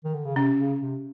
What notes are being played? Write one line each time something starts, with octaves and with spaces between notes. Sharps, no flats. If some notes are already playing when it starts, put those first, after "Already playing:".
D#3
D3
C#3
C3 C#4
C#3
C3